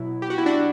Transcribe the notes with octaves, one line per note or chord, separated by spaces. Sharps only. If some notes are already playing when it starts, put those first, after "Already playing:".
Already playing: B2 F#3 E4
G4
F#4
E4
D4 F#4